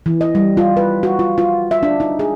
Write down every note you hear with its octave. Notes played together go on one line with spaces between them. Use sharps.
E3
D#5
G3
F4
B4
F#4
F4
F4
E5
D4
D#4
G#4